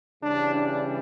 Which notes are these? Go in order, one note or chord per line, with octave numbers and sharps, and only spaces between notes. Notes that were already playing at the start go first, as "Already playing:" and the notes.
C#3 E3 G3 D4
D4